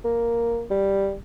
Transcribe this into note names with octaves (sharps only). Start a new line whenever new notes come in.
A#3
G3